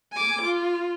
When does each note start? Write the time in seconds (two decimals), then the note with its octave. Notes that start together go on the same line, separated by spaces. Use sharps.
0.13 G#5 D6
0.42 F4